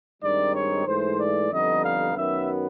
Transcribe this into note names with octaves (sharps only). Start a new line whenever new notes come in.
G2 D#3 G#3 C4 D#4 D5
C#5
G#2 E3 A3 C5
D5
F2 D3 G3 B3 D#4 D#5
F5
F#2 D#3 F#3 B3 E5